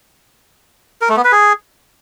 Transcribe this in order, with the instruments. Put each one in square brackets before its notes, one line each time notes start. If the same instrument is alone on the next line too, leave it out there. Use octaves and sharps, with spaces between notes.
[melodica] A#4
A3
B3
B4
G#4